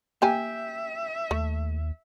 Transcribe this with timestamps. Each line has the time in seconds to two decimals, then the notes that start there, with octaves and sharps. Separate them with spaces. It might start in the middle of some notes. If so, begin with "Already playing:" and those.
0.22 A#3 G4 E5 G5 G#5
1.31 D#2 A3